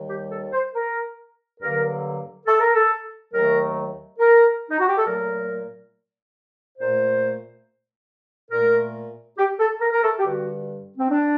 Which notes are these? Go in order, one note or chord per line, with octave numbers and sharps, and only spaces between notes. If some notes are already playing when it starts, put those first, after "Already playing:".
Already playing: D#2 D#3 G3
G4
A4
C5
A#4
G2 D3 F#3 A#3 A#4
A4
A#4
A4
D#2 D#3 F#3 A3 A#4
A#4
D#4
F#4
G4
A4
A#2 F#3 A3 A#4
A#2 A3 C5
A#2 A3 A#4
G4
A4
A#4
A#4
A4
G4
G2 D3 G3 F#4
C4
D4